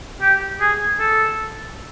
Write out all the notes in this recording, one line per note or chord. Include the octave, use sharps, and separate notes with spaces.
G4
G#4
A4